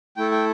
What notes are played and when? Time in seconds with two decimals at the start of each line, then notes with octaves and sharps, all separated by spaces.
0.17 A3 E4 A4 G5
0.32 G5